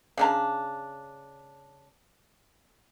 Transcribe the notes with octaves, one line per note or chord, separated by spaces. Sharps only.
C#3 D4 A#5